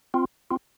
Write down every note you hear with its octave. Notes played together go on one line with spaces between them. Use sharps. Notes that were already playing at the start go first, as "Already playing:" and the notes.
C4 F4
C4 F4